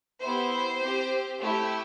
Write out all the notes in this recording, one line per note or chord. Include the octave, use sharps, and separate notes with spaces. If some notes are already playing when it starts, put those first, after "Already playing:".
B3 E4 G4 C5
C4 G4
A3 E4 G4